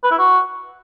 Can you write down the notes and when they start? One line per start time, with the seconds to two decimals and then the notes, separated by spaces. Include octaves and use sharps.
0.04 B4
0.11 E4
0.19 F#4